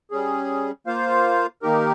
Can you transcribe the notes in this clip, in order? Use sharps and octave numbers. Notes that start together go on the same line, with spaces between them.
G3 C#4 G#4
A#3 F4 C5 F5
D#3 A#3 D#4 G4 A#4